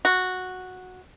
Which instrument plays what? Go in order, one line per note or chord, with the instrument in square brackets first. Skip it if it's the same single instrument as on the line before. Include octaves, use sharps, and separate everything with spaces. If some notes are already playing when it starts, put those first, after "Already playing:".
[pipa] F#4